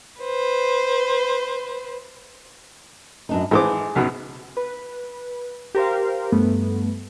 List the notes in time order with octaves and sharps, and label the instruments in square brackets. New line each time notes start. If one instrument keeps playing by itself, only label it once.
[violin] B4 C5
[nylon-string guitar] F#2 D4 D#4
[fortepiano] G#1 E3 D6 [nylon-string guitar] G#4 A4 C5
[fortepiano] B1 F#2 B2
[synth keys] B4
G4 A#4 C5 F5
G2 A3 B3